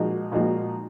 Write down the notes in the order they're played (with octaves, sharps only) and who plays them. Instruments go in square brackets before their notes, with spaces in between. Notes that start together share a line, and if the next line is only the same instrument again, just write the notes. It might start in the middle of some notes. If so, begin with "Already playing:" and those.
Already playing: [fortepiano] A#2 F3 G#3 D#4 F#4
A#2 F3 G#3 D#4 F#4